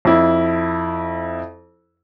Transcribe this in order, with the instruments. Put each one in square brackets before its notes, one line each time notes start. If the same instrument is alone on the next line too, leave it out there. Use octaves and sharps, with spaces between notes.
[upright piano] F2 E4